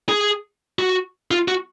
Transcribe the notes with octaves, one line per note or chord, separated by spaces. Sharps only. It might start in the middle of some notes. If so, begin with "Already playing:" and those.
G#4
F#4
F4
F#4